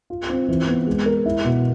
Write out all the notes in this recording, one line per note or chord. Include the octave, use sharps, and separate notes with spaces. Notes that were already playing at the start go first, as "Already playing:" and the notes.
F4
C4
E3
B3
G#3
A#4
E4
B2